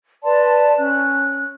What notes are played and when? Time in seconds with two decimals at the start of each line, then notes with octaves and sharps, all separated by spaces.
0.24 B4 D5 A5 C6
0.77 C#4 F#6